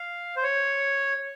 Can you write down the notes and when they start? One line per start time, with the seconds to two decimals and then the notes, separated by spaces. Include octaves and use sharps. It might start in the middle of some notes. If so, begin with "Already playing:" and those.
Already playing: F5
0.36 C5
0.43 C#5